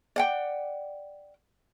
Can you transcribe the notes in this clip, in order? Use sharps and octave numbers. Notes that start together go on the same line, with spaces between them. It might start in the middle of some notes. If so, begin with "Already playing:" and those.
D5 F#5 G5